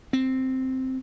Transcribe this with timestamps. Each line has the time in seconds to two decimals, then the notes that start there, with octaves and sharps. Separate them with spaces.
0.13 C4